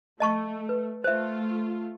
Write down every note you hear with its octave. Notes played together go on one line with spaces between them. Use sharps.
A3 D#5 A5 C#6
B4
A3 F4 C5 E5